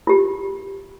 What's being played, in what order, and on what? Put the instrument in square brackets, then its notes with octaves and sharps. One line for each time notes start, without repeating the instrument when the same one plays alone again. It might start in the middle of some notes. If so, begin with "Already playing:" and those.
[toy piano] F4 G4